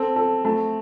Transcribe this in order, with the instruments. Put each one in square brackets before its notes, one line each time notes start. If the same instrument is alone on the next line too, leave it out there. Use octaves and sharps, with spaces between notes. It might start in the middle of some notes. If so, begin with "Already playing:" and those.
Already playing: [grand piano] C4 [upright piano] A4
[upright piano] A4
A3